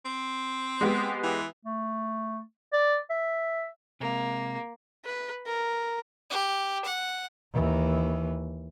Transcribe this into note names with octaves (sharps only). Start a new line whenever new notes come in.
C4
G#3 B3 G4
E3
A3
D5
E5
C3 G#3 A#3
B4
A#4
G4
F#5
D#2 E3